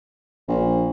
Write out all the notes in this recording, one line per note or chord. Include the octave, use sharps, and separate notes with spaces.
A#1